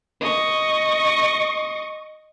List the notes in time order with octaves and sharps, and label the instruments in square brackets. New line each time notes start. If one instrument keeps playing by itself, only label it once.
[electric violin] D#5 C#6